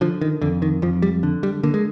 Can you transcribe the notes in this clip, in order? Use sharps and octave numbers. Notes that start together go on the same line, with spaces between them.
D3 F3
D#3
F2 D3
D#3
F2 F3
G3
D3
G3
D3 A#3
G#3